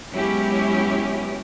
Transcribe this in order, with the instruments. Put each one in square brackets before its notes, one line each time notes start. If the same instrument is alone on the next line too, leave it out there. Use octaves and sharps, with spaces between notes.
[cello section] F#3 G#3 B3 C#4 E4 G4